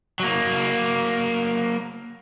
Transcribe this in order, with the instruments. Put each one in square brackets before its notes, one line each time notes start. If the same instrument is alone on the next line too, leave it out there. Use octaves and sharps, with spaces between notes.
[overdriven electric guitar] F#3 A#3